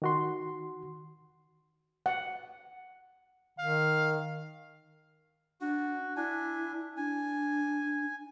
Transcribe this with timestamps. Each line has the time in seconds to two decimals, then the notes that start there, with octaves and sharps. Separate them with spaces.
0.02 D#3 F#4 C6
2.06 F#5
3.59 D#3 F5
5.61 D4 F#4
6.17 D4 E4 G#5
6.97 D4 G#5